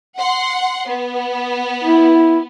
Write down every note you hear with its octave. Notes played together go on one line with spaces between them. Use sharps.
F#5 C6
B3
E4